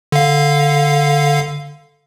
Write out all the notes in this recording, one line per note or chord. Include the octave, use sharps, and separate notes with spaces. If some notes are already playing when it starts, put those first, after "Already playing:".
D3 F5